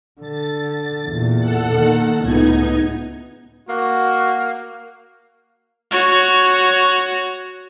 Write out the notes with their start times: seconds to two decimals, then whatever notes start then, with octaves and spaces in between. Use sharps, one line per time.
0.21 D3 A6
1.07 E2 A#2
1.40 A4 F#5
1.74 D#3 A#3
2.21 C#2 A2 B3 D#4 G#6
3.69 A#3 F#4
5.91 F#4 C#5